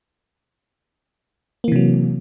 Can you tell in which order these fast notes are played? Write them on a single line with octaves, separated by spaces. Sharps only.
A#3 E3 C3 F#3